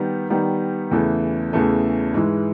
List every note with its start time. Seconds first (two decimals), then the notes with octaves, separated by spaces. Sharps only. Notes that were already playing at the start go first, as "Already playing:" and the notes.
Already playing: D#3 G3 B3
0.30 D#3 G3 B3
0.91 E2 C#3 E3 A3
1.53 E2 C#3 E3 A3
2.14 G#2 E3 G#3